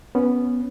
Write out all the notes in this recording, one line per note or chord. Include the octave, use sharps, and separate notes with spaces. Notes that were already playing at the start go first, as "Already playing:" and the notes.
B3 C#4